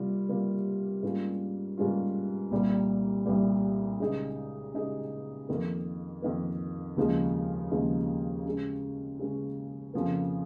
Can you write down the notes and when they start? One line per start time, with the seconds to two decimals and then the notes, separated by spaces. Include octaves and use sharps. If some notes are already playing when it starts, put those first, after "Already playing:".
Already playing: C3 G3 A#3 F4
0.29 C3 G3 A#3 F4
1.03 G#2 G3 A#3 C#4 F4
1.78 G#2 G3 A#3 C#4 F4
2.51 C2 A#2 G3
3.26 C2 A#2 G3
4.00 C#3 G#3 D#4 G#4
4.74 C#3 G#3 D#4 G#4
5.49 F2 D#3 A#3
6.22 F2 D#3 A#3
6.97 D#2 C#3 F3 G#3 D#4
7.71 D#2 C#3 F3 G#3 D#4
8.46 C#3 G#3 C#4
9.19 C#3 G#3 C#4
9.94 F2 C#3 F3 A#3